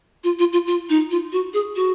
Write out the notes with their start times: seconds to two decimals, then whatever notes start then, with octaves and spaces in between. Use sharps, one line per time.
0.24 F4
0.39 F4
0.53 F4
0.67 F4
0.89 D#4
1.11 F4
1.32 F#4
1.54 G#4
1.76 F#4